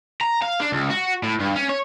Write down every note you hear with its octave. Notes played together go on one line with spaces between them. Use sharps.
A#5
F5
D4
C#2
F#4
A2
G2
C#4
C#5